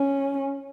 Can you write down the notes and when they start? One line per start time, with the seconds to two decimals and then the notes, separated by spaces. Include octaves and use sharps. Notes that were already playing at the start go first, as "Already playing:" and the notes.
Already playing: C#4